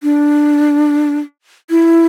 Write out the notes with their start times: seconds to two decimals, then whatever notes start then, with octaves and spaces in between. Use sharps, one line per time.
0.03 D4
1.70 E4